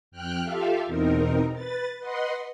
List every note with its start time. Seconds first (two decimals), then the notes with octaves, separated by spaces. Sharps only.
0.11 F2 G5 F6 F#6
0.44 F4 G4 A4 E5 F5
0.87 E2 B2 C4 D#4 A#4
1.54 B4 A6
2.00 B4 D#5 F#5 C6